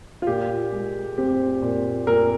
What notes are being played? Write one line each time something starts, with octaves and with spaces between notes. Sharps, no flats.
F4
A#2 G4
G#3
C4 G4
A#2
A#2 A#4